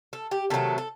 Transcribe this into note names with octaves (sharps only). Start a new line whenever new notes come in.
A4
G4
C3 D#3 F#3 A3 A4
A4